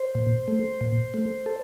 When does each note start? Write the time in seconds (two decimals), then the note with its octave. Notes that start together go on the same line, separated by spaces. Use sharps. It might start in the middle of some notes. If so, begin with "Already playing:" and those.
Already playing: C5
0.15 A#2
0.48 A3
0.81 A#2
1.14 A3
1.46 A4